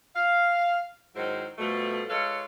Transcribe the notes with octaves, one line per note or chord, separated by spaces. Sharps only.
F5
G#2 D#3 F#3 E4 C5
B2 F3 G3 A3
G#3 F4 A4 B4 C#5 F5